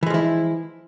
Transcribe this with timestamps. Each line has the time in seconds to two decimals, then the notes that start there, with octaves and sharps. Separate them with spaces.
0.03 E3
0.06 G#3
0.10 F3
0.14 E4